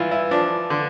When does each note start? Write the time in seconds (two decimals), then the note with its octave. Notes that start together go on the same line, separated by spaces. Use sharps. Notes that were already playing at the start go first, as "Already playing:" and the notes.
Already playing: G2 E3 E4 F4
0.11 E4
0.31 F3 D4
0.70 D3